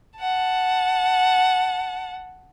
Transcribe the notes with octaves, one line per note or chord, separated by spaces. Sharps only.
F#5 A5